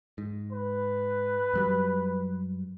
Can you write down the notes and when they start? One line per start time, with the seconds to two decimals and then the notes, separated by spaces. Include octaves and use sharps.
0.18 G#2
0.52 B4
1.53 F#2 F#3 G3